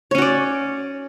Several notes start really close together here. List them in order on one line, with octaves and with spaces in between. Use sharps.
C#5 C#4 F#4 D5